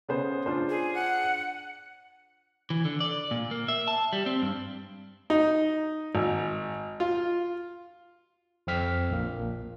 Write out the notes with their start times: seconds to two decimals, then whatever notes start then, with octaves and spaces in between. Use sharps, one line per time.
0.08 C#3 B3 C5
0.46 D4 F4 C5
0.69 G#4
0.94 F#5
2.70 E3
2.85 D3
3.00 D5
3.31 A#2
3.51 A#3
3.68 E5
3.88 A5
4.13 G3
4.26 C4
4.42 G2
5.30 D#4
6.15 G#1
7.00 F4
8.67 F2 C4 F6 B6
9.10 A#1 A#3